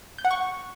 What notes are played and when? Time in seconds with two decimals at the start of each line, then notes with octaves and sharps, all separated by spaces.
0.18 G6
0.25 F#5
0.31 C#6